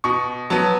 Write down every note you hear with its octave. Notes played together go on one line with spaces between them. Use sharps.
B2 C#6
F#3 B3 A5